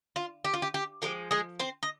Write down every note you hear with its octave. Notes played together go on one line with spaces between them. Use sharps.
F4
G4
F4
G4
G4
D3 F3 G#3 G4
G#3 G#4
C4 C5
D#5